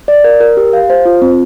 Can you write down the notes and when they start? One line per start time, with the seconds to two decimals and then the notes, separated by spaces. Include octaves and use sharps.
0.08 D5
0.24 A#4
0.40 A#4
0.57 G4
0.73 F5
0.90 C5
1.05 F4
1.22 C4